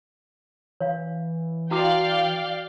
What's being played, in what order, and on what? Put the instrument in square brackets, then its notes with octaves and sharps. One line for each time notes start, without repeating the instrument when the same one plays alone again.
[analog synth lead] E3 [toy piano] C#5 F5
[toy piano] E4 F#4 D6 [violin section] D5 F5 G5